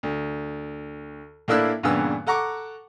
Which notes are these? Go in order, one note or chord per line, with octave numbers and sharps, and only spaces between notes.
D2
A2 A#3 D4 E4 E6 F#6
G2 A#2 C#3 E3 B3 E6
A4 F#5 A#5 C#6 D6